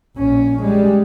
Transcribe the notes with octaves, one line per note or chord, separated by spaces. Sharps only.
A#1 C#4
G3 G#3